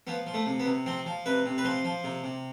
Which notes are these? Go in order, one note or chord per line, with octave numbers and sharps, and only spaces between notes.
F3 B3
F3
A3
C3
B3
C3
F3 C4
F3
C3 B4
C3
B4
F3 C5
F3
C3
C3